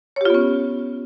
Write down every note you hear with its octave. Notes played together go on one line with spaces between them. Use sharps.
B3 C#4 F4 G4 C#5